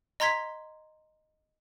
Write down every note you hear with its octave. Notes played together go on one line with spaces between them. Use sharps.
D#5 A#5 C6 G#6 B6